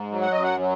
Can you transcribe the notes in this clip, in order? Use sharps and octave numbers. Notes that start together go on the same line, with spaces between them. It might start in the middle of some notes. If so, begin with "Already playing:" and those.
Already playing: G#2
F#3
F#5
F#2 D#5
F#5
F#3